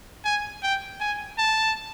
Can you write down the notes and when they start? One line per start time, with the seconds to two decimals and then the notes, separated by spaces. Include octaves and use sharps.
0.25 G#5
0.63 G5
1.00 G#5
1.38 A5